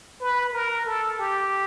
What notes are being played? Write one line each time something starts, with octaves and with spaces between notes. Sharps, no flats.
B4
A#4
A4
G4